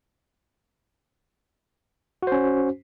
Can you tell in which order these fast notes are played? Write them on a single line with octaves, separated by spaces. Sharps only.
F#4 C5 C#4